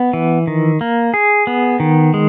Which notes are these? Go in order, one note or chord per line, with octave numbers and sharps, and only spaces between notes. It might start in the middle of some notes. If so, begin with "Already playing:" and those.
Already playing: B3
E3
D#3
A#3
G#4
B3
D#3
G#3